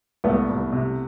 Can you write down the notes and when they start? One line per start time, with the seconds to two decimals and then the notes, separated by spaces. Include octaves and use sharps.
0.24 C2 A3 B3
0.49 C2
0.73 C3